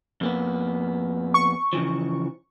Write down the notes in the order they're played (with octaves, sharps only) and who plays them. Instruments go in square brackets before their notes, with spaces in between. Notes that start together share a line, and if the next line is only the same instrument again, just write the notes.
[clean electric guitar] F2 A#3 B3
[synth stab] C#6
[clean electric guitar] C#3 E3 F3